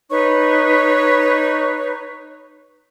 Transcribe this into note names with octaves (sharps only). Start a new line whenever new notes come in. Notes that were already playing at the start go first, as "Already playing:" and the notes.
D#4 B4 C#5 C#6